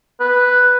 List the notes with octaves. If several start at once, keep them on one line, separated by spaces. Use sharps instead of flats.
B4